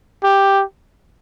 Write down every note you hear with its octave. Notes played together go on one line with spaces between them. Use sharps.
G4